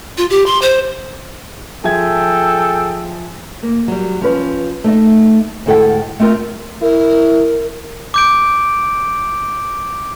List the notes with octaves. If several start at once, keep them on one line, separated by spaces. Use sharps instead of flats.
F4
G4
C6
C5
F3 G#4 A4 E5 G5 G#6
A#3
F#3 G3
F3 C#4 B4
A3 D#4 E5
D2 G#2 E4 A4 F#5 G5
A3 C4 F4 A#4
E4 A#4
D6 G6 D7